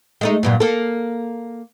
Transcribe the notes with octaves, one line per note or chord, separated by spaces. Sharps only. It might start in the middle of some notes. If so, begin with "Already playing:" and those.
G#3 A3 D#4
G2 A#2 F#3
A#3 A4